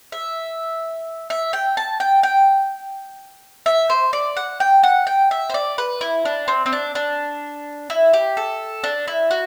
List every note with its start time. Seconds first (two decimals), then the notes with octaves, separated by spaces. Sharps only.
0.12 E5
1.30 E5
1.53 G5
1.77 A5
2.00 G5
2.23 G5
3.66 E5
3.90 C5
4.13 D5
4.37 F#5
4.60 G5
4.83 F#5
5.07 G5
5.31 E5
5.50 C5
5.54 D5
5.78 B4
6.01 E4
6.25 D4
6.48 C4
6.66 C4
6.73 D4
6.95 D4
7.90 E4
8.13 G4
8.37 A4
8.84 D4
9.08 E4
9.31 F#4